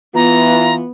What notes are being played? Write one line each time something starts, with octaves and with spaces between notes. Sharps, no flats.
E3 B3 F4 A#5